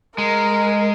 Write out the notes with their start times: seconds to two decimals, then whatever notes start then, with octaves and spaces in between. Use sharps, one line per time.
0.18 G#3 A#4